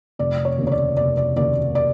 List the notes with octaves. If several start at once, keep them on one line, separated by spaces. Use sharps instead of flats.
F1 D5
C#5
D#2 C#3
C#5
D5
F1 D5
D5
D#2 C#3 D5
D5